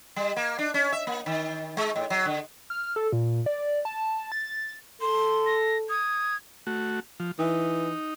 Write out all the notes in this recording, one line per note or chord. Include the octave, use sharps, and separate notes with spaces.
G3
A#3
D4
C#4
E5
A#3
D#3
G#3
A2
F#3
D3
F6
A4
A#2
D5
A5
A6
A4 C6
A#6
D#6 G#6
A3 F#4
F3
E3 D#4